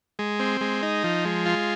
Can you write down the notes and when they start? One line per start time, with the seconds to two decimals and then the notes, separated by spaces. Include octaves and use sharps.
0.19 G#3
0.39 C4
0.61 G#3
0.83 D#4
1.04 F3
1.25 G#3
1.46 F4